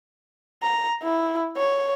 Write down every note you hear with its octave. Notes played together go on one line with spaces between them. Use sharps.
A#5
E4
C#5